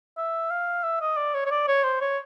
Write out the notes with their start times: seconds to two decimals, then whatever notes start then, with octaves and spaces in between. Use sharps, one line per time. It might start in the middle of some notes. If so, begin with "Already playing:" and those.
0.17 E5
0.51 F5
0.83 E5
1.01 D#5
1.17 D5
1.34 C#5
1.46 C#5
1.51 D5
1.68 C#5
1.84 C5
2.01 C#5